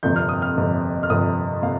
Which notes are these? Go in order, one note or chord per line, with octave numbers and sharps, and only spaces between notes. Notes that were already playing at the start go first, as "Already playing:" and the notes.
G1 F2 C3 G6
F6
D#6
F6
G1 F2 C3
F6
G1 F2 C3 D#6
C3 F5